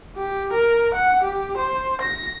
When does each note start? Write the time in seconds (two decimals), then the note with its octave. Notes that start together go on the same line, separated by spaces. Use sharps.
0.18 G4
0.53 A#4
0.94 F#5
1.24 G4
1.58 C5
2.02 A#6